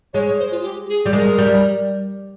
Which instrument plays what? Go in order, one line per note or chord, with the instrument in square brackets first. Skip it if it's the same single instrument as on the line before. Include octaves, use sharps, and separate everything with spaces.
[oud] G#3 [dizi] C#5
[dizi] C#5
C5
F4
G4
G#4
[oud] G3
[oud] G#3 [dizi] A#4
[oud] G3